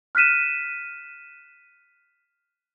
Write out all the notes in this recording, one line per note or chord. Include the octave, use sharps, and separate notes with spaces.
F6 F#6 B6 D#7 E7